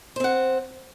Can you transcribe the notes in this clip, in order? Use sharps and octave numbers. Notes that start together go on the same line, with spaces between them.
C4 C5 F#5